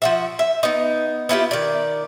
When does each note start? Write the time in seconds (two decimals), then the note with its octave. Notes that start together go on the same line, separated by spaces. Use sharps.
0.02 F3 F#4 E5
0.39 E5
0.63 B3 D#4
1.29 B3 E4 F4 G4
1.51 D#3 D5